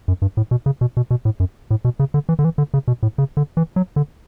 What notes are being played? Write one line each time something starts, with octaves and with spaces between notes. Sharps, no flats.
F#2
G2
A2
B2
C#3
B2
B2
B2
A2
F#2
A2
B2
C#3
D3
E3
D3
E3
D3
C#3
B2
A2
C#3
D3
E3
F#3
D3